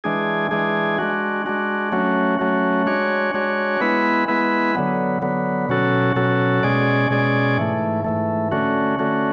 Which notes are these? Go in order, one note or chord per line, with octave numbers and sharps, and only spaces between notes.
E3 G#3 D4 G#4
E3 G#3 D4 G#4
G#3 D4 F#4
G#3 D4 F#4
F#3 A3 C#4 F#4
F#3 A3 C#4 F#4
G#3 D4 F#4 C#5
G#3 D4 F#4 C#5
G#3 B3 E4 B4
G#3 B3 E4 B4
D3 F#3 B3
D3 F#3 B3
B2 F#3 C#4 F#4 A4
B2 F#3 C#4 F#4 A4
B2 G#3 C#4 G#4 D5
B2 G#3 C#4 G#4 D5
G#2 E3 A3
G#2 E3 A3
D3 A3 C#4 F#4
D3 A3 C#4 F#4